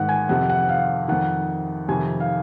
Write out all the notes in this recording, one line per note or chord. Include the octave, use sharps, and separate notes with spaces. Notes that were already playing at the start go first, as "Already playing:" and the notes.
Already playing: G#2 D#3 F#5
G#5
F2 C3 D#3 F#5
F#5
F5
F2 D#3 F#5
F2 C3 D#3 G#5
F5